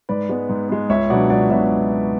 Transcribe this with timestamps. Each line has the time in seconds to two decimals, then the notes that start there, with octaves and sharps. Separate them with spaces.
0.09 G#2 B4 D5
0.29 G#3 B3
0.49 G#2
0.69 G#3 B3
0.89 C#2 C#5 E5
1.10 B2 F#3 B3 D4 D5 F#5
1.30 C#2 D5 F#5
1.50 B2 F#3 B3 D4 C#5 E5